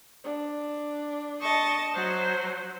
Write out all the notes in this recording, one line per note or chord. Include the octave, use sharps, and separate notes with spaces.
D4
D#5 A5 C#6
F#3 F#4 C5